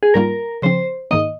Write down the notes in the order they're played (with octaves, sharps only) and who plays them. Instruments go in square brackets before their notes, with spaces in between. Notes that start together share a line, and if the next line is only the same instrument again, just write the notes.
[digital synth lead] G#4
[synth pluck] G#2 G3 A#3 F4 [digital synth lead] A#4
[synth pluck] C#3 F3 C4 [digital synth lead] C5
[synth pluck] G#2 D#3 A#3 [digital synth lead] D#5